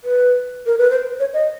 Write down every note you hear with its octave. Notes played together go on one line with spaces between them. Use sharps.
B4
A#4
B4
C5
C#5
D#5